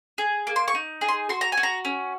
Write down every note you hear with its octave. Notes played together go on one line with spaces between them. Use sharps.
G#4
A#3
C6
C#6
D#4
G#4
C6
F#4 C6
A#5
G#5
F#4
A#5
C#4